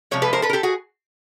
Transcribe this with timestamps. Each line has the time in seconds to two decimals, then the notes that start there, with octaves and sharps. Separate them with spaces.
0.11 C3 F3 G#3 C#5
0.22 A4 B4
0.33 A#4 C5
0.42 A4 B4
0.50 A#4
0.53 G4 A4
0.63 F#4 G#4